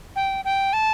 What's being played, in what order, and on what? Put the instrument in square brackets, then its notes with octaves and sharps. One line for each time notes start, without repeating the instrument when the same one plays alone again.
[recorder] G5
G5
A5